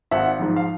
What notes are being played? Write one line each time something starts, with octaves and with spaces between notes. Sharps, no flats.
G#1 E5 F#5
G#2 F3
F5